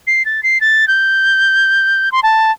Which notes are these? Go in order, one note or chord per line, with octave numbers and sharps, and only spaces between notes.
C7
A6
C7
A6
G6
C6
A5